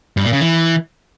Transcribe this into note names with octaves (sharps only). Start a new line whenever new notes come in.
G2
A#2
C#3
E3